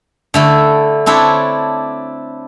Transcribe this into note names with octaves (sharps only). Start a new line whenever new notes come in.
D3 A3 E4
C4 D4 E4 A4 C#5